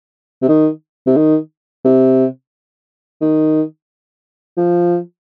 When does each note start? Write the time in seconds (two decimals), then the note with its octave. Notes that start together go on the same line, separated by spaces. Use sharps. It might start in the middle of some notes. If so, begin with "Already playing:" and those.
0.42 C3
0.48 D#3
1.07 C3
1.17 D#3
1.85 C3
3.21 D#3
4.57 F3